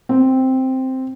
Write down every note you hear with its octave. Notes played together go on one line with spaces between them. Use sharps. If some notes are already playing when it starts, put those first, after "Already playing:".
C4